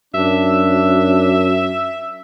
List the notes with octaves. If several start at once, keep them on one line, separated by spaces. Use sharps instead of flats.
F#2 D4 E5